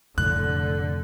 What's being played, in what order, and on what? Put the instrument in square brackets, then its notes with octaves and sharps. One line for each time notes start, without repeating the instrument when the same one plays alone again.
[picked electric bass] F1 [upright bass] A2 [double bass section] D3 [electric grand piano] F#6